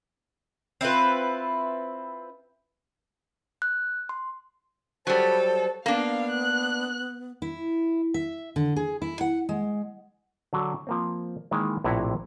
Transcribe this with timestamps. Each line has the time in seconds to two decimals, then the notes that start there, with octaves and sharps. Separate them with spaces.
0.81 C4 E4 F4 B4
3.62 F#6
4.09 C6
5.07 F#3 G3 A4 C5
5.86 A#3 B3 D4 F5
6.30 F#6
7.42 E4
8.14 E5
8.56 D3
8.76 G#4
9.02 E4
9.21 F#5
9.49 G#3
10.53 D3 F#3 D4 F#4
10.87 F3 A#3 C4
11.51 D#3 E3 G#3 A#3
11.84 A#1 A2 C3 E4 F#5 A#5